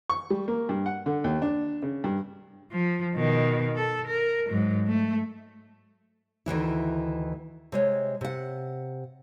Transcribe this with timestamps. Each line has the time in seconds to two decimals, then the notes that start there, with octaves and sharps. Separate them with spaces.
0.10 C#6
0.30 G3
0.48 A#3
0.69 G2
0.86 F#5
1.06 D3
1.24 D#2
1.42 D4
1.83 C#3
2.04 G2
2.72 F3
3.16 B2 D#3
3.77 A4
4.07 A#4
4.49 G#2 F#3
4.87 A3
6.46 D2 D#3 E3 E4
7.72 C3 G#3 C#5
8.21 C3 F#5